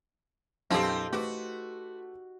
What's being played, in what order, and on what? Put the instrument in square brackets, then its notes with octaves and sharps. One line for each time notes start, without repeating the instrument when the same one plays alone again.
[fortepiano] B1 F#2 [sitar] C4 D#4 G4 [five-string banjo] F4 A4
[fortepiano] A3 B4 D6 [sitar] F#4